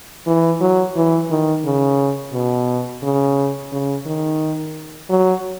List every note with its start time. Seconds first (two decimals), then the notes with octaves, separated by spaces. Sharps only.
0.27 E3
0.61 F#3
0.96 E3
1.31 D#3
1.65 C#3
2.33 B2
3.03 C#3
3.72 C#3
4.06 D#3
5.10 F#3